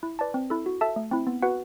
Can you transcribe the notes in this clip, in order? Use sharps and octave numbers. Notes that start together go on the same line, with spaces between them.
E4
B4 D5 A5
C4
E4 A4
F#4
A4 E5 A5
A3
C4 E4
B3
F#4 B4 F#5